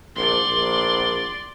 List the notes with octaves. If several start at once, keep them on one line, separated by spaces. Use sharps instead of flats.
A#1 D5 C6
A#1